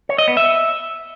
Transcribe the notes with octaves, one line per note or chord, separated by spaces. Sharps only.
C#5
D#5
B3
E5